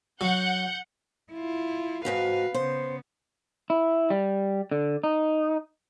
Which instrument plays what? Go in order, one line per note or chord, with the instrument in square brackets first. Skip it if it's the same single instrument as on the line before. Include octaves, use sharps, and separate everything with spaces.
[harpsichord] F#3 [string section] F#5 G6
[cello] E4 F4
[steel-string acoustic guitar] F2 G#2 F#4 [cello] B4 F5
[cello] C#3 B3 [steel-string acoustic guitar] C5
[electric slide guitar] E4
G3
D3
D#4